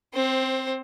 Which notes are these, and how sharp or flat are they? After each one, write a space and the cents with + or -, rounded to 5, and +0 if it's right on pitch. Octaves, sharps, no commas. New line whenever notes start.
C4 +0 C5 +20